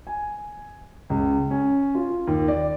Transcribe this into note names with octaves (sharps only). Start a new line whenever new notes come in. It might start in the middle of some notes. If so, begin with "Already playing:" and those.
G#5
C#2
C#4
F4
D#2
D5